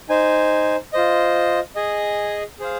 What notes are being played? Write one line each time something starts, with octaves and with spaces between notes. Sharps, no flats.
D#4 C5 G#5
F4 C5 D#5
G#4 D#5 G#5
G#4 C5 F5